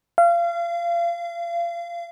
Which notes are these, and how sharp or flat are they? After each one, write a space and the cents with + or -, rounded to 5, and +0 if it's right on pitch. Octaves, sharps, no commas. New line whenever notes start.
F5 -30